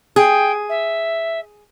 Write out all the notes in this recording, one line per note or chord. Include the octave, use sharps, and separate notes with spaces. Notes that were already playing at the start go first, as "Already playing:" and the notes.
G#4 G5
E5